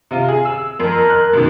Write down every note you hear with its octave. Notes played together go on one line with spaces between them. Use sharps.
C3 F4
G#4
E6
F2 A#4
F#6
F#2 B2 D#3